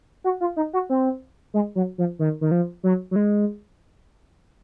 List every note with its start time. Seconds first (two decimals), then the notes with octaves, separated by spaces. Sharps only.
0.24 F#4
0.41 F4
0.57 D#4
0.73 F#4
0.90 C4
1.54 G#3
1.75 F#3
1.98 F3
2.19 D#3
2.41 D#3
2.51 F3
2.83 F#3
3.11 F#3
3.16 G#3